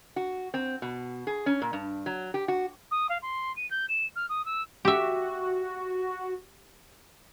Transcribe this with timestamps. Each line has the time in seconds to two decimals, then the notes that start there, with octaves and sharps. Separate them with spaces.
0.16 F#4
0.54 C4
0.82 B2
1.27 G#4
1.46 C#4
1.62 A#2
1.73 G2
2.06 F#3
2.34 G4
2.48 F#4
2.91 D#6
3.09 F5
3.22 C6
3.56 D#7
3.71 G6
3.89 E7
4.16 F6
4.29 D#6
4.45 E6
4.85 F#4 G4 E5